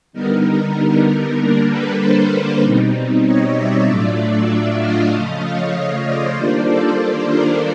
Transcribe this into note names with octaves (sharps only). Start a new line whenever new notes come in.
D3 G3 B3 D#4 A#4
A#4
D3 G3 A#3 D4
A4 B4
A#4 C5
B2 G3 C4 D#4
C#5 D#5
D5 E5
A2 F#3 A3 D4 F4
D5 E5
D#5 F5
C#3 F3 A3
C#5 D#5
C5 D5
D#3 G3 A#3 D4 F4 C5 D5
A4
A4
A#4